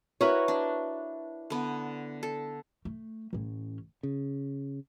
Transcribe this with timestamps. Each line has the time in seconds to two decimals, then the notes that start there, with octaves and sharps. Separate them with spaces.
0.21 E4 F#4 A#4 B4 C#5
0.48 D4
1.50 D3 B3
2.23 A4
2.85 A3
3.33 A1 C#4
4.03 C#3